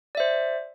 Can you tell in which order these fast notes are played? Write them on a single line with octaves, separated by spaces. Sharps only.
D5 E5 C5